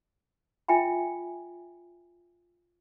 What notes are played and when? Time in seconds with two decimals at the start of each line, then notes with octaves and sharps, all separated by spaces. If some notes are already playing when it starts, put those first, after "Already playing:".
0.68 F4 E5 G5 G#5 B5